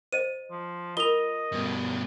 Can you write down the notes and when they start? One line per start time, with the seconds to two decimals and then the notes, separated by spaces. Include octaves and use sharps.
0.13 C5 D#5 D#7
0.51 F3
0.97 F4 A#4 D#5 D#6 F7 G7
1.52 G2 B2